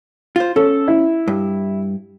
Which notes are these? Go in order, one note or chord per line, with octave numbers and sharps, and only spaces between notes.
F4 C5
C#4 A4
E4
G2